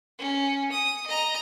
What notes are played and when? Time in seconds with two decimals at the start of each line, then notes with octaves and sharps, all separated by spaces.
0.19 C#4
0.72 D#6
1.06 D#5 A#5